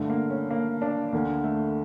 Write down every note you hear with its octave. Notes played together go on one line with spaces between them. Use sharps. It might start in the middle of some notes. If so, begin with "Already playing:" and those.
Already playing: G2 D3 A3
A#3
C#4
A#3
D4
D2 D3 A#3
A3